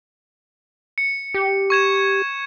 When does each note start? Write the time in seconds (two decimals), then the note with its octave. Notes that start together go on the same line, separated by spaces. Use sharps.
0.98 C#7
1.34 G4
1.70 C#6 G#6 E7